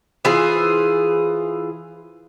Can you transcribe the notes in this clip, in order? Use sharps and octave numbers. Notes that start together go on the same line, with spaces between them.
E3 F4 G#4 C5